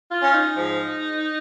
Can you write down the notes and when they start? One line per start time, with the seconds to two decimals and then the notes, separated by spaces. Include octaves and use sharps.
0.10 F4
0.22 C#4
0.33 D#4
0.56 G#2 F3